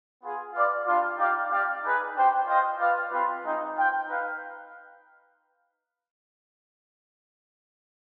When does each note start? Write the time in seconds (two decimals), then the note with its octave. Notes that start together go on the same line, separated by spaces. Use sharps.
0.22 B3 F4 G#4
0.54 F4 B4 D5 F5
0.86 G3 D4 F4
1.18 D#4 G4 D5 F5
1.50 C4 G4 D5 F5
1.83 D#4 G#4 B4
2.15 D4 G4 C5 G5
2.46 F4 C5 D#5 G5
2.79 F4 B4 D5 F5
3.11 G3 C4 F4 B4
3.43 G#3 C4 D#4
3.76 F4 C5 G5
4.07 D#4 B4 F5